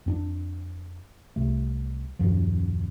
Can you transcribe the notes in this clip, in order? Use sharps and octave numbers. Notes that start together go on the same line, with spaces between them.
F2 C#4 D4
C2 C3 A3
D#1 G#1 F#2 F3